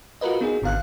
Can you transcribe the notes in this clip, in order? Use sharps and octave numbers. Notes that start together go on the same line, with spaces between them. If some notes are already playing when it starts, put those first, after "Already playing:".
F4 F#4 A#4 B4 D#5
B3 D#4 G#4
G#1 D3 B3 F5 F#6